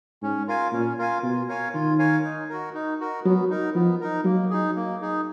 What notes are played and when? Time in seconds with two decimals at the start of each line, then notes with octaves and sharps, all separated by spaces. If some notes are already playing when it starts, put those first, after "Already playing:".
0.22 G#2 C#4
0.48 F4 A#4 F5 G#5
0.72 A#2 C#4
0.98 F4 A#4 F5 G#5
1.23 B2 F4
1.48 A#4 C#5 F5 G#5
1.74 D#3 F4
1.99 A#4 C#5 F5 G#5
2.24 D#4
2.49 F#4 A#4
2.74 D#4
3.00 F#4 A#4
3.24 F#3 B3
3.50 D#4 A#4
3.75 F3 B3
4.01 D#4 A#4
4.25 F#3 A#3
4.50 D#4 G#4
4.76 A#3
5.01 D#4 G#4